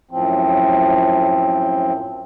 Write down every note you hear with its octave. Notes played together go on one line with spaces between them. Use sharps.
F#2 A2 F3 C4